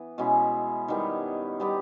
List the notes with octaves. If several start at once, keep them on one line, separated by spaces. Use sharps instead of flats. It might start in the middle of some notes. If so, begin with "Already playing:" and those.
Already playing: E3 B3
B2 G#3 C#4 E4
D#3 G3 B3 E4
G3 B3 G4